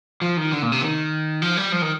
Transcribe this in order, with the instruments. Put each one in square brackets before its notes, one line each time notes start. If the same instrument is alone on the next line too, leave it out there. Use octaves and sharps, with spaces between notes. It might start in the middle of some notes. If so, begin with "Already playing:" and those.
[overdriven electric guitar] F3
D#3
D3
A#2
C3
D#3
F3
G3
F3
D#3